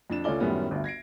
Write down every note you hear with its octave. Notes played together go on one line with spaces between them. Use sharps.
F2 D4 E7
C#2 A3 C#4 F4 D5 G7
F#2 A2 D#3 G3 B3 C#4
G1 D2
G#6 A#6 C7 D7